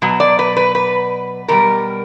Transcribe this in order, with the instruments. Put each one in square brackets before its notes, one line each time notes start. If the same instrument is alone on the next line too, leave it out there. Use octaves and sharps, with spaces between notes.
[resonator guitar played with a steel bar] B2 F#3
D5
B4
B4
B4
B2 G3 A#4